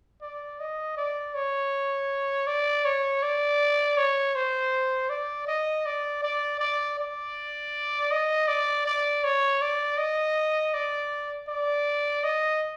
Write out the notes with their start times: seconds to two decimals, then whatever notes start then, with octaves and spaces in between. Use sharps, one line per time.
0.22 D5
0.60 D#5
0.97 D5
1.35 C#5
2.47 D5
2.85 C#5
3.23 D5
3.97 C#5
4.35 C5
5.10 D5
5.48 D#5
5.86 D5
6.23 D5
6.60 D5
6.99 D5
8.11 D#5
8.48 D5
8.86 D5
9.24 C#5
9.62 D5
9.98 D#5
10.74 D5
11.49 D5
12.24 D#5